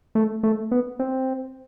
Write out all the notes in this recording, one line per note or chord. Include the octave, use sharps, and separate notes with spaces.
A3
A3
B3
C4